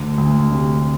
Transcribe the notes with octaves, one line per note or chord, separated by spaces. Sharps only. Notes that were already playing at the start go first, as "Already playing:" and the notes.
Already playing: D2
D2
C3